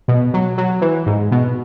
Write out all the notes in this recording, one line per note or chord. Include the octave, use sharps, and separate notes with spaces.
B2
F#3
F#3
E3
G#2
B2